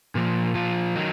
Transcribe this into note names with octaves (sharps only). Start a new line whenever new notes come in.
A#2 F3
A#2 F3 F4
D#3 F#3 D#4